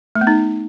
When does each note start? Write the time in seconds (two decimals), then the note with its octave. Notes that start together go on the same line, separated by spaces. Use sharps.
0.15 A3
0.21 B3
0.27 D#4